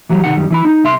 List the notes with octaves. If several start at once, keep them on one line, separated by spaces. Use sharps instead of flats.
E3 F#3 G3
C3 D#3 F#5
F#2 D#3 G3
E3 E4 B5
D#4
C2 E5 C6